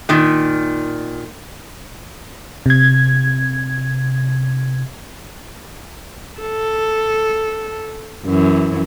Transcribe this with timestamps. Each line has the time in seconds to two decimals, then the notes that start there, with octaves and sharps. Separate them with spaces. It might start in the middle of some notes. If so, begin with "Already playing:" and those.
0.09 A#2 D#3
2.66 C3 G#6
6.40 A4
8.26 F#2 E3